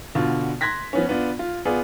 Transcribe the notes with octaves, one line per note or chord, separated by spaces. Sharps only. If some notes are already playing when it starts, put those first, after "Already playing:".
B2 D3 F4
C6 F#6 G#6 A#6 B6
F3 B3 C#4
B3 D4 F4
F4
B3 F4 G#4 D5